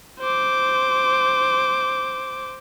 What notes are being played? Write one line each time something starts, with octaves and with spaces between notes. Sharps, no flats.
C5 D6